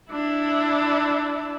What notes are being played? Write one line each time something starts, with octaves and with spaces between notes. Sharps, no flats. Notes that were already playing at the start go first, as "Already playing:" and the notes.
D4 E4